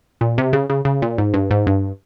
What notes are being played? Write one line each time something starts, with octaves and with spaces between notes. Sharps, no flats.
A#2
C3
C#3
C#3
C#3
A#2
G#2
G2
G#2
G2